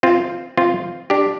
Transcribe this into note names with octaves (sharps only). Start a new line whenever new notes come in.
C4 F4
C4 F4
D4 G4